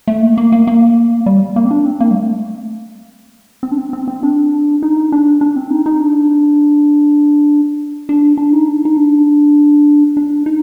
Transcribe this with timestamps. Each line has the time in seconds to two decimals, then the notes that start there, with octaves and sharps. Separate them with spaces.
0.07 A3
0.22 A#3
0.38 A#3
0.52 A#3
0.67 A#3
1.26 G3
1.56 A#3
1.65 C4
1.71 D4
1.85 C4
2.00 A#3
2.11 G3
2.15 A3
3.63 C4
3.71 D4
3.78 C4
3.93 C4
4.08 C4
4.23 D4
4.83 D#4
5.12 D4
5.41 D4
5.56 C4
5.71 D#4
5.86 D#4
6.01 D4
8.09 D4
8.37 D4
8.53 D#4
8.68 D4
8.85 D#4
8.97 D4
10.17 D4
10.46 D#4